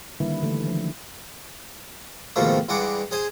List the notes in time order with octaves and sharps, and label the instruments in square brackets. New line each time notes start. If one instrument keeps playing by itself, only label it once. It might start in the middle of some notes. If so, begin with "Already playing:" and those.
[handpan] D3 D#3 G3 A#3 E4 B4
D3 E3 A3 D4
D#3 F3
[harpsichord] G#2 B2 D#3 F3 A3 A#3
G2 E3 G#3 F#5 C#6 D6
G#4 C5 G#5